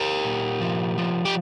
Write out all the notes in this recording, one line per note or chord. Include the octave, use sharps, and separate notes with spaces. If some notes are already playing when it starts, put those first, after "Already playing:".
Already playing: G4 A#4
A#2
F3
F3
G4